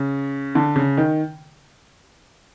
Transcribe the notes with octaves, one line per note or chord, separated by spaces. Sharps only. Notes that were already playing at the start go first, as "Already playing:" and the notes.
Already playing: C#3
D3
C#3
D#3